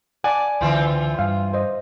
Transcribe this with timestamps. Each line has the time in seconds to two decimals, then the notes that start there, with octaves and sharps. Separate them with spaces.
0.24 D5 F#5 G#5 A5 D6
0.61 C#2 D3 E3 C4 F4
1.19 G2 F5
1.54 C5 D#5